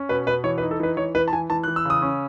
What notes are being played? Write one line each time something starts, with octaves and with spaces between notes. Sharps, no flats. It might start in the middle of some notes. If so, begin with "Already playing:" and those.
Already playing: C#4
B2 B4
B2 B4
E3 C#5
B4
D#4
A4
E3 B4
E3 C#5
E3 B4
A5
E3 G#5
E3 A5
F#6
E3
E6
C#3 D#6
C#4